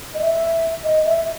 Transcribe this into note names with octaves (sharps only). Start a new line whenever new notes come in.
D#5
E5
D#5
E5